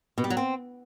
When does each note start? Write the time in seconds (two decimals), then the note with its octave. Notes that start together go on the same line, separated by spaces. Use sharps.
0.18 B2
0.24 G3
0.30 F#3
0.37 C4